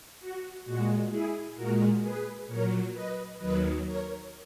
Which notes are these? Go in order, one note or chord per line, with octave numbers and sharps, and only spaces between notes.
F#4
A#2 G#3 F#4
E4 G#4
A#2 G#3 F#4 A#4
G#4 B4
A#2 F#3 A#4 C#5
B4 D#5
D#2 D#3 F#3 B4 D#5
A#4 C#5